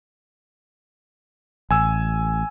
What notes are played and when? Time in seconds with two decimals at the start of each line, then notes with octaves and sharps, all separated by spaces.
1.71 A1 G#5 E6